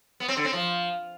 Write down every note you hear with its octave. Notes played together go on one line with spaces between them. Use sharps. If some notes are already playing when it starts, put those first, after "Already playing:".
B3
C4
D3
C4
F3